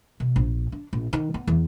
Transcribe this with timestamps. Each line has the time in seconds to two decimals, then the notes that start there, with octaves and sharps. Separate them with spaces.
0.20 B2
0.36 A#1
0.72 D4
0.93 A#1
1.13 D#3
1.34 B3
1.47 E2